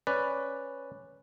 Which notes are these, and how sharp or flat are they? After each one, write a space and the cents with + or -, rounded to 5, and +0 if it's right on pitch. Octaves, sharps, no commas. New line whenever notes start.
C#4 -5 B4 +0 D5 +0